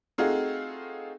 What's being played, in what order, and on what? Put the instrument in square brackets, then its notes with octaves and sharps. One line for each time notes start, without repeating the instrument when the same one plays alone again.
[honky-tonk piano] A3 C4 D#4 F4 F#4 G#4